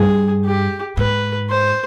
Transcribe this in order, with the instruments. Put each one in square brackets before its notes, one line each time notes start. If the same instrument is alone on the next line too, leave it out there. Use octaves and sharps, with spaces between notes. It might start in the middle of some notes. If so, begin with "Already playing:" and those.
Already playing: [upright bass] G2 [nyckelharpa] G#4
[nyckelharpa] G4
[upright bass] G#2 [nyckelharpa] B4
[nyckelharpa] C5